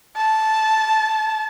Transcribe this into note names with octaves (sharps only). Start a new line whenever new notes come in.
A5